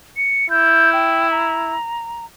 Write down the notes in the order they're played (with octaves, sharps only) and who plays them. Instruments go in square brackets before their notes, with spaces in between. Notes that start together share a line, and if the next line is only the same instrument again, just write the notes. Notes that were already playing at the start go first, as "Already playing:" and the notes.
[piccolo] C#7
[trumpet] E4 [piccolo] G6
[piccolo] G5
A#5